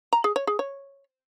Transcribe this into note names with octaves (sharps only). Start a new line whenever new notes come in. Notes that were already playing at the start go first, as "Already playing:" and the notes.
A#5
G#4
C#5
G#4
C#5